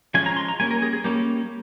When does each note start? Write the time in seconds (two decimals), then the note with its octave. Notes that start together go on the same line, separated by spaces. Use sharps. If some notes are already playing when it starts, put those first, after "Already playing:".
0.14 F3 G#3 C#4 G#5
0.26 A#5
0.36 C6
0.48 A#5
0.59 G3 A#3 C#4 G#5
0.71 A#4
0.82 G#4
0.93 G#4
1.04 G3 A#3 C#4 G4